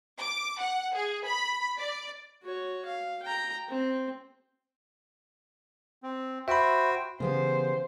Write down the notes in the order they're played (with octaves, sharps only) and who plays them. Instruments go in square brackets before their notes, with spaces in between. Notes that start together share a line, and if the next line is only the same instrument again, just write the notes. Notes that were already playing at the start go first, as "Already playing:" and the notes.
[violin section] D6
F#5
G#4
B5
D5
[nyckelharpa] F#4 C#5
F5
G5 A#5
C4
[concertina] C4
[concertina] F#4 C5 G5 [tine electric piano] E5 B5
[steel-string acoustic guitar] C#3 B3 G4 [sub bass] E3 [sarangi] C5